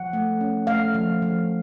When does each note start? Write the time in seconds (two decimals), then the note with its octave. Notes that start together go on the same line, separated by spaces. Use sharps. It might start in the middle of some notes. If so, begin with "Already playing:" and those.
Already playing: F3 F#5
0.13 A3
0.41 C#4
0.67 A3 F5
0.94 F3
1.22 F3